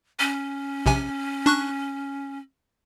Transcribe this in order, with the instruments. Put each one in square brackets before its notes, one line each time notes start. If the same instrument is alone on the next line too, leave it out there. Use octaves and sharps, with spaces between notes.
[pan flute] C#4
[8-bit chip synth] A#1 C3 G#5
D4 C#6 F#6